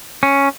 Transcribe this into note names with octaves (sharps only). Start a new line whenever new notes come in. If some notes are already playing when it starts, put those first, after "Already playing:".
C#4